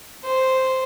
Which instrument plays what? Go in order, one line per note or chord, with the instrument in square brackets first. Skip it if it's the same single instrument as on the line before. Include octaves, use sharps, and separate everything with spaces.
[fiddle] C5